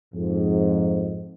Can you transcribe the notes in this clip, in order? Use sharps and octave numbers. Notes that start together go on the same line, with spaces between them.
F2 G#2